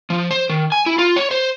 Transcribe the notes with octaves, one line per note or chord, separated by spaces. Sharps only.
F3
C5
D#3
G#5
E4
F4
C#5
C5